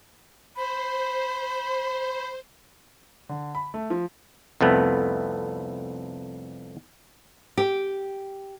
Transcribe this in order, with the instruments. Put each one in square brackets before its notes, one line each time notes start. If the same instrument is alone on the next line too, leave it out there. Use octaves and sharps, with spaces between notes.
[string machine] C5 [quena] B5
[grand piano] D3
B5
A3
F3
[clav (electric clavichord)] C2 F2 A3 B3
[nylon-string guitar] G4